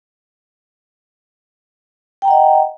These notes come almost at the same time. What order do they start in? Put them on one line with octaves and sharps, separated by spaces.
G5 A#5 F#5 D#5